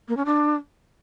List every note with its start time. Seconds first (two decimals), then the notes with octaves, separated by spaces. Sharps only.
0.08 A#3
0.17 C#4
0.26 D4